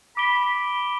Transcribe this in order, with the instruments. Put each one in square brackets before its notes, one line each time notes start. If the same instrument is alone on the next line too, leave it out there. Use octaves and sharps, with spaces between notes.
[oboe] B5 [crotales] D6 D7 G7